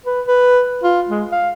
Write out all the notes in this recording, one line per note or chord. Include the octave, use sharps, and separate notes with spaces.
B4
B4
F4
G#3
F5